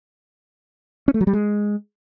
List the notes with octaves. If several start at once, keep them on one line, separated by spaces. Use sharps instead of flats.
C#4
A3
F#3
G3
G#3